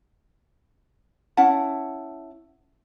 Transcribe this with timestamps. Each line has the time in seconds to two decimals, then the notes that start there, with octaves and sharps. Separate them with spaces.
1.37 C#4 E4 F#5 A5